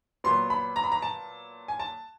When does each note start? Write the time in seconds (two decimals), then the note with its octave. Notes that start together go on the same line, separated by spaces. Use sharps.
0.24 A#2 F#3 B3 C6
0.50 B5
0.76 A#5
0.84 B5
0.92 A#5
1.02 A5
1.68 G#5
1.80 A5